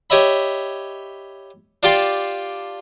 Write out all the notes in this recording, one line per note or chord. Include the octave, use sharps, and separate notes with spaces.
G4 C#5 D#5 E5 B5
D4 F4 G4 G5 A5 C6